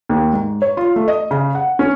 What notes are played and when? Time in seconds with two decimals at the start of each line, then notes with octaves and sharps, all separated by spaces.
0.09 D#2
0.33 G#2
0.62 C#5
0.77 F4
0.96 A3
1.08 D#5
1.31 C#3
1.55 F#5
1.79 C#4